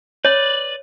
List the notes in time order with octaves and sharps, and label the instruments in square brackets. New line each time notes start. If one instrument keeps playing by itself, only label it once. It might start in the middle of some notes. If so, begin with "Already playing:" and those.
[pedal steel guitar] B4 D5 [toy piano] C#5